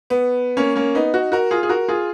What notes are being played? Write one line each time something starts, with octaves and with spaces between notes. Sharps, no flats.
B3
A#3 C#4
A#3 C#4
B3 D#4
D#4 F#4
F#4 A#4
F4 G#4
G#4
F#4 A#4
F4 G#4